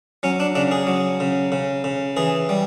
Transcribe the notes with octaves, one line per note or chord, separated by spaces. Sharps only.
F#3 C#4
D4
C#3 D4
G#4
F#3
C#3
C#3
C#3
E3 G#4
G3